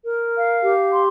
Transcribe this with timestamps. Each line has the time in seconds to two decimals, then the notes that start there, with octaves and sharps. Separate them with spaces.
0.05 A#4
0.34 F5
0.63 G4
0.93 C6